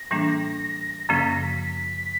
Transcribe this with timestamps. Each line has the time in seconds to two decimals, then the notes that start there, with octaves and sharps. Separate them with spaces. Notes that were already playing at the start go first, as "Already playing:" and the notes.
Already playing: A#6
0.11 A2 E3 G3 A#3 D4
1.09 F#2 C#3 F3 A#3 C#4 B6
1.26 A#6
1.42 B6
1.59 B6